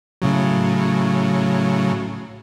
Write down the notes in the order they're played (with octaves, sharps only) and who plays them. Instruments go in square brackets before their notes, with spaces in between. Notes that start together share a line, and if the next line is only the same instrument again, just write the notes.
[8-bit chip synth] A2 C#3 F#3